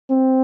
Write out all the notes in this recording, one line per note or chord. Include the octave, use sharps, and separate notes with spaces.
C4